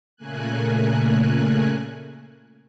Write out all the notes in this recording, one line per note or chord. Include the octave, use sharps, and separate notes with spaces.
A#2 C#3 A3 A#3 G#5 F#6